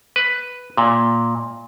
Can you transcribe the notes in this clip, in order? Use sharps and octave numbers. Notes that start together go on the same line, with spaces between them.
B4
A#2